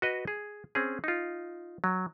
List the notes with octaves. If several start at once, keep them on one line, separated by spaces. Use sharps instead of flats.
F#4 B4 D#5
G#4
C4 C#4 G#4
D#4 F4
F#3